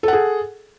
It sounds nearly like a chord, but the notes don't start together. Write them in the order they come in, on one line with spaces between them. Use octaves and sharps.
A4 F#5 G#4